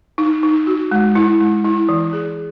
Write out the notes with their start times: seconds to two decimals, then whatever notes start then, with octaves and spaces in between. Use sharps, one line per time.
0.18 D#4
0.43 D#4
0.67 F#4
0.91 G#3
1.15 E4
1.41 G#3
1.64 E4
1.89 E3
2.13 G#4